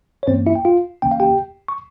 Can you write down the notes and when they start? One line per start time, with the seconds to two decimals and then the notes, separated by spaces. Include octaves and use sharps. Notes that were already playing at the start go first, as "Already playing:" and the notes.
0.23 C#5
0.27 G2 E3 A#3 C4 C#4 C5
0.46 E4 E5
0.55 G5
0.65 F4 F5
1.02 C#2 C#3 E3 A#3 C#4 G5
1.11 F5
1.20 G4 G5
1.68 C#6